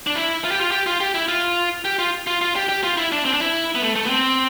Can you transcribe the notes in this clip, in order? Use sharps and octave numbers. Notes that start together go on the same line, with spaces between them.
D4
E4
F4
G4
F4
G4
F4
G4
E4
F4
G4
F4
F4
F4
G4
G4
F4
E4
D4
C4
D4
E4
B3
A3
A3
B3
C4